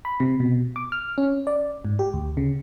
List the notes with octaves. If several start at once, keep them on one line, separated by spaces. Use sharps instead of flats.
B5
C3
B2
D6
F6
C#4
D5
G#2
G4
D2
C#3